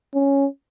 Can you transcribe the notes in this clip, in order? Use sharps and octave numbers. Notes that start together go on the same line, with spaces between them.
C#4